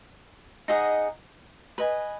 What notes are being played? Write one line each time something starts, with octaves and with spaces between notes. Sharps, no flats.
D#4 G#4 D#5 F#5
B4 D#5 G#5